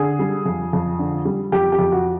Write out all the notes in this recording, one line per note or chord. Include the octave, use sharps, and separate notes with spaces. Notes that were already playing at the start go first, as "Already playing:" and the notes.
Already playing: D3 G#4
G3
F2
F2
D3
G3
F2 G4
G4
F2
F#4